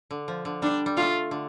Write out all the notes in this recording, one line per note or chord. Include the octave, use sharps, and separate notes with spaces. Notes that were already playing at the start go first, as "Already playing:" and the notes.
D3
F3
D3
G3 D4
G3
A3 F4
D3